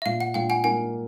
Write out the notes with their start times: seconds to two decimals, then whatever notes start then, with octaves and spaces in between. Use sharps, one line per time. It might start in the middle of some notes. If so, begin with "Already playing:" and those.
0.02 E5
0.05 A#2 F5
0.20 F#5
0.34 A#2 F5 G5
0.50 F#5 G#5
0.64 A#3 F#5 G#5